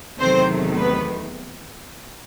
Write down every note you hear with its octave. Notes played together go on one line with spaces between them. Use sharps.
E2 C3 D#3 F#3 A3 C4 C5
B3 B4